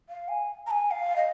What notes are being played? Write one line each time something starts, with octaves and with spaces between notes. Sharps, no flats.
F5
G#5
A#5
G#5
F5
D#5